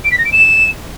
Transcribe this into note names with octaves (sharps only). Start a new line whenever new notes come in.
D7
B6
A#6
D7
E7